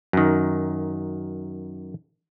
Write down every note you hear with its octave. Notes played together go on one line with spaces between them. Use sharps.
F#2 D#3